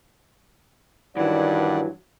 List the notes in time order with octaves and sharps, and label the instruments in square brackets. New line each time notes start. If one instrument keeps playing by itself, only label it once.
[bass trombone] G2 [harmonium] D#3 D5 F#5 [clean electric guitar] E3 F#3